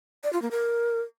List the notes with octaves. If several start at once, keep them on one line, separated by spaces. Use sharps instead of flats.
D5
F4
A#3
A#4